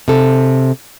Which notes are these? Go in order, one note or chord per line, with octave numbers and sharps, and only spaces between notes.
C3 A4